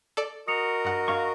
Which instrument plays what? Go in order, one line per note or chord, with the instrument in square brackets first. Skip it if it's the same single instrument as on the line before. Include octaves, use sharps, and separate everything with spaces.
[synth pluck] A4 D5
[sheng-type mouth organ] F#4 A#4 D#5 [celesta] D#6 C#7 F7
[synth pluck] G2 F#5
[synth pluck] G2 [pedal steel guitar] F5 C#6